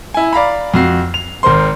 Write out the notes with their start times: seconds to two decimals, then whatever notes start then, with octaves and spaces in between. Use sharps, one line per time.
0.14 E4 G#5
0.33 D5 F5 A#5 B5
0.74 F2 F#4 C7
1.14 F7
1.43 G#1 A#4 C5 C6